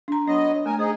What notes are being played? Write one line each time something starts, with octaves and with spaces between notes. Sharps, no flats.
D4 A#5
F#3 B3 D4 D#5
A3 A#4 G#5
D#4 G#4 C5